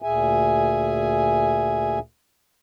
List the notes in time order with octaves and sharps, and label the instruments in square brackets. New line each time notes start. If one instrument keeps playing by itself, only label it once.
[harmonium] D2 A#2 G#4 E5 G#5